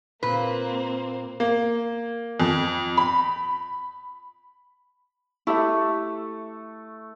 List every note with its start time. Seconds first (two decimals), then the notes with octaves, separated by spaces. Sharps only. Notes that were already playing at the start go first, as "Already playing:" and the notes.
0.23 A#2 A#3 C4 B4
1.40 A#3
2.40 F2
2.97 B5
5.47 A3 E4 G4 E5